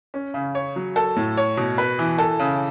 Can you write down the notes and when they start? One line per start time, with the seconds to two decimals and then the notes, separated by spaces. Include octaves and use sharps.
0.14 C#4
0.34 C#3
0.55 C#5
0.76 F#3
0.96 A4
1.16 A2
1.37 C#5
1.57 B2
1.78 B4
1.99 E3
2.18 A4
2.39 C#3